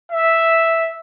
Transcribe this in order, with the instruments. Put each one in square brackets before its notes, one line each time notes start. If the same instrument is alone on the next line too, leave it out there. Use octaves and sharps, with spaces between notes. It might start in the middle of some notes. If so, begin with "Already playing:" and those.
[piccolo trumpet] E5